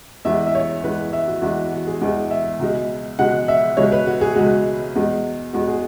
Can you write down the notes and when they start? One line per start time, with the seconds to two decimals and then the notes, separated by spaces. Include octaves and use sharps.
0.25 E2 E3 G#3 E5
0.47 E5
0.55 C#5
0.84 E2 E3 G#3 B4
1.13 E5
1.28 F#4
1.42 E2 E3 G#3 F#4
1.72 F#4
1.87 G#4
2.01 E2 E3 G#3
2.31 E5
2.59 C#2 B2 G#3
3.19 C#2 B2 G#3 F#5
3.48 E5
3.77 C#2 B2 G#3 C#5
3.92 B4
4.07 F#4
4.21 G#4
4.36 C#2 B2 G#3 F#4
4.95 E2 B2 G#3
5.53 E2 B2 G#3 F#4
5.68 G#4